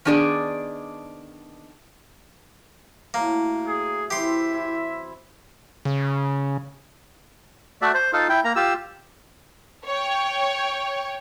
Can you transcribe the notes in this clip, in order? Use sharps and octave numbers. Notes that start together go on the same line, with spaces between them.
D#3 B3 D4 G#4 D5
A2 A#3 F#4
G#4
E3 C4 G4 E5 C6
E4
C#3
A3 F#4 D5 E5
C5
D#4 F4 A4 F5
E4 G5
A#3 A#5
F4 G4 E6
C#5 G5